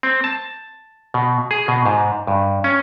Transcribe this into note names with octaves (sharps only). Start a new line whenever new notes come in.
C4
A5
B2
G#4
B2
G#2
G2
C#4